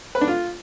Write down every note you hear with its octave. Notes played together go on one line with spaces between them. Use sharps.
B4
D4
F4